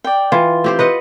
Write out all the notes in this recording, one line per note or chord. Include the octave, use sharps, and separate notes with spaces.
D5 G5
E3 F4
C4 G4 C5
B4 D#5 F#5